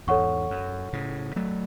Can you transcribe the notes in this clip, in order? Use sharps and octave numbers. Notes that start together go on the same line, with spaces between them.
E2 G#2 A4 C#5 F#5 C#6
F#2
A2 C#3
F#3 A3